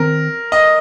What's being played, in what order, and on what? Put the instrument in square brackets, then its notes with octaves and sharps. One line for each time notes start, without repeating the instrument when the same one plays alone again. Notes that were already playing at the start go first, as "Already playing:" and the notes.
Already playing: [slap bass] D#3 C4 [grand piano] A#4
[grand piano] D#5